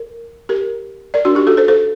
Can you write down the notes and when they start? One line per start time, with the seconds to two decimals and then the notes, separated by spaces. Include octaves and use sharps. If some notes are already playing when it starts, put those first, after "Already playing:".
Already playing: A#4
0.49 G4 A#4
1.14 A#4 D5
1.25 D4 F#4
1.35 D#4 G4
1.47 F#4 A4
1.57 A4 C5
1.68 A4 C5